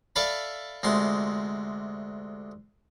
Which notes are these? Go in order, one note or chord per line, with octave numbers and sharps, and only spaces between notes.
A4 D5 E5 F5 A5 B5
D2 C3 G#3 C6